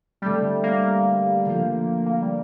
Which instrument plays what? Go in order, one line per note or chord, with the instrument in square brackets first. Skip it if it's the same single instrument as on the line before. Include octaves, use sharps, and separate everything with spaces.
[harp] D3 A3 C4 [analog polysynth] G3
[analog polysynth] A#3
[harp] D3 F3 C4 F4
[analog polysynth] A#3
G3